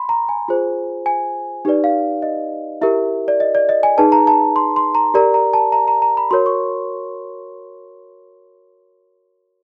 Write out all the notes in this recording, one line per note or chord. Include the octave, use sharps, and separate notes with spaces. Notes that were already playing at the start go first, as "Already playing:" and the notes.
Already playing: B5 C6
A#5
G#5
F4 G#4 C5
G#5
D#4 G4 B4 D5
F5
D#5
E4 G4 A#4 E5
D5
D#5
D5
D#5
G#5
D#4 G#4 B4 A5
A#5
A5
C6
C6
A#5
G4 A#4 D5 A#5
A#5
A5
A#5
A#5
A#5
B5
F#4 A#4 C#5 C6
C#6